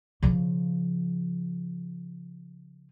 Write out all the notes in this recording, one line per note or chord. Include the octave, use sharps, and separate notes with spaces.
C#3 F3